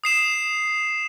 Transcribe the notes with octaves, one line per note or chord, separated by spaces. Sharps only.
D#6 C7 E7